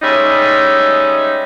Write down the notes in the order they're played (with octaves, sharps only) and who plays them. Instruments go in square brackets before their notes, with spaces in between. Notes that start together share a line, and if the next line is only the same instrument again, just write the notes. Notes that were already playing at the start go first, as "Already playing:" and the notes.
[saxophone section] G3 G#3 C#4 D#4 E5